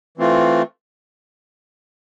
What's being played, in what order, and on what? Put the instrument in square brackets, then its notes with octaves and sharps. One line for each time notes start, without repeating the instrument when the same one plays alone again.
[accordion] E3 A3 C4 F4